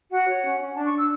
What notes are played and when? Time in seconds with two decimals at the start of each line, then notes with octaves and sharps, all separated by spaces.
0.10 F#4 F#5
0.27 C#5
0.42 C#4
0.59 C#4
0.75 D4 A5
0.86 C#6
0.92 D4
0.97 E6